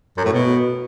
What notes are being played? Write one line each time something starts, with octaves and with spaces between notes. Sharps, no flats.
F#2
A2
B2